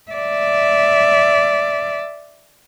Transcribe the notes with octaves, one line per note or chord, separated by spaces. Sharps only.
D5 E5